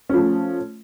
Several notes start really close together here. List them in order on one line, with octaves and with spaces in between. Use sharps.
C#4 F3 A3